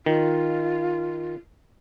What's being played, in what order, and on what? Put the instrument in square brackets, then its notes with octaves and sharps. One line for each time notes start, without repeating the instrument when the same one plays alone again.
[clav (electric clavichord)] D#3 [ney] F4